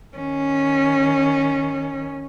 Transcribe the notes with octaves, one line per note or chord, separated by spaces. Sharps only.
D#3 C#4